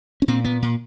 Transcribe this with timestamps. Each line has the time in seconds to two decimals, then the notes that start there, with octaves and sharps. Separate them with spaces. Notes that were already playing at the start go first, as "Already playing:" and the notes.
0.22 C#4
0.28 A#2 C4
0.44 A#2 B3
0.62 A#2